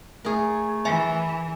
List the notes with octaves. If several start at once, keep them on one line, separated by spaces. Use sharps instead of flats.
A3 G#4 A#4
E3 E5 G#5